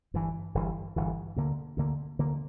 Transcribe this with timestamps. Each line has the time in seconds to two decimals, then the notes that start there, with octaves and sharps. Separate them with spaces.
0.14 G1 G2 E3
0.55 G1 G2 E3
0.96 G1 G2 E3
1.36 D2 D3 A#3
1.77 D2 D3 A#3
2.19 D2 D3 A#3